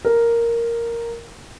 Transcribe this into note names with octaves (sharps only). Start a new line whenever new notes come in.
A#4